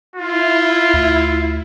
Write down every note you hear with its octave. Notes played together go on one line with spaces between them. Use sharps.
E4 F4
D2